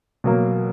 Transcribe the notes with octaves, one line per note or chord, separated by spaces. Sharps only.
B2 F#3 A#3